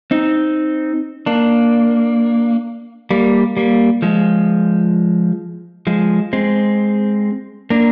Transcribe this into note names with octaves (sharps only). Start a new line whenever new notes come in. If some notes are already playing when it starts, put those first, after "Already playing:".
C4 D#4
A#3 D4
G3 A#3
G3 A#3
F3 G#3
F3 G#3
G#3 C4
A#3 D4